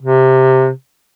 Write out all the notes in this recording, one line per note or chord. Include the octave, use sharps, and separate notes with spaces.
C3